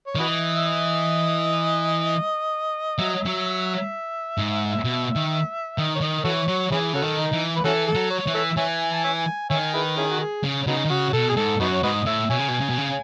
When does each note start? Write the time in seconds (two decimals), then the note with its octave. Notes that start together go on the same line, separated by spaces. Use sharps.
0.07 C#5
0.15 D#3
0.19 E3 F#4 B4 D#5
0.56 E5
0.65 D#5
2.99 F#3 E5
3.10 D#5
3.20 E5
3.26 F#3
4.38 G#2
4.85 B2
5.16 D#3
5.78 D#3 D#5
5.95 C#5
6.01 D#3 D#5
6.24 E3 F#4 A4 C#5
6.48 F#3 C#5
6.72 E3 C#4 E4 G#4
6.93 C#3 C#4 F#4 A4
7.02 D#3
7.18 D#4
7.33 E3
7.56 B4
7.64 E3 C#4 F#4 A4
7.87 A4
7.95 F#3
8.10 C#5
8.27 E3
8.34 A4 C#5 E5
8.57 E3 C#5 E5 G#5
8.92 A5
9.04 C#5 E5 G#5
9.50 D#3 C#5 E5 G#5
9.74 E4 G#4 B4
9.97 C#4 E4 G#4
10.11 F#4
10.20 G#4
10.44 C#3
10.67 C#3 F#3 B3 D#4
10.85 D#3
10.90 C#3 F#4
11.13 B2 A4
11.30 G#4
11.36 G#2 A4
11.60 F#2 B3 D#4 F#4
11.73 C#5
11.83 G#2 F#4 B4 D#5
12.06 A2 E5
12.30 B2 C#5 E5 G#5
12.39 C#3
12.48 B2
12.61 C#3
12.69 B2
12.78 C#3